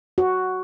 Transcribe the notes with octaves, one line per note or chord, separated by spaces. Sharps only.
F#4